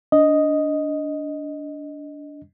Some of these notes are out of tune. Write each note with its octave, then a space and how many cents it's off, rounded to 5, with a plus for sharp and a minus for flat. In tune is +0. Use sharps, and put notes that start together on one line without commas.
D4 -15 D#5 +0